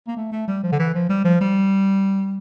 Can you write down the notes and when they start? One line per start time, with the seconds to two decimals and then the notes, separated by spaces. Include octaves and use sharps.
0.08 A#3
0.17 A3
0.32 A3
0.48 G3
0.63 F3
0.72 D3
0.79 E3
0.95 F3
1.09 G3
1.25 F3
1.41 G3